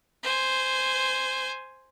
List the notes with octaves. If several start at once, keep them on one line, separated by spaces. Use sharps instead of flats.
C5 G#5